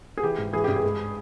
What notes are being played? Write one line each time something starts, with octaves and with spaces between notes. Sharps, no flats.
G#4
E3 G4
G#2
E3 G#4
G2 G4
G#4
G#3